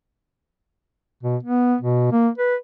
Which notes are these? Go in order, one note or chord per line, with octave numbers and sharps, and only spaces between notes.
B2
B3
B2
A#3
B4